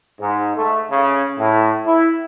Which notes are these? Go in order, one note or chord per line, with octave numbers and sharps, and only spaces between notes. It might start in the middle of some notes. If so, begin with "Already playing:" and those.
G#2
A3
C#3
A2
E4